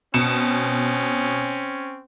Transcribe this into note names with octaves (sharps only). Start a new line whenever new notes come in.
B2 C4 C#4 C#7 E7